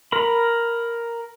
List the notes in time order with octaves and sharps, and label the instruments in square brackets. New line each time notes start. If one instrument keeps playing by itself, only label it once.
[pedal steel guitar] A#4 B5